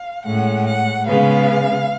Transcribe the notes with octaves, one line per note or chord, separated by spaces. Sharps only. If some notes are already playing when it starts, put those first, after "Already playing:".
Already playing: F5
A2 G#3 C#4 F#5
F#5
C#3 G#3 B3 F5